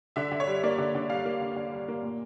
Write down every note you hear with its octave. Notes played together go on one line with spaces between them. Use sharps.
D3 E5
D3
C#5
G3
A#3 D5
D3
D3
G3 F5
A#3
D3
D3
G3
A#3
A#2